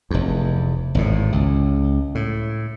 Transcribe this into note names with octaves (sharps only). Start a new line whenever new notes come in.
F1 E2
G#1 E2 A2
C#2
A2